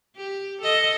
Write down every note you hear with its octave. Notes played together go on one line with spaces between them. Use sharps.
G4
A4 D#5